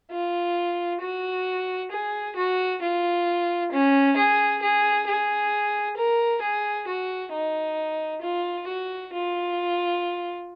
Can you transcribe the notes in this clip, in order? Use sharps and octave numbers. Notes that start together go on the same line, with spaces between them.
F4
F#4
G#4
F#4
F4
C#4
G#4
G#4
G#4
A#4
G#4
F#4
D#4
F4
F#4
F4